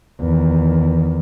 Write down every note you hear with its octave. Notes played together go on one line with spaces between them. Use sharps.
E2 D#3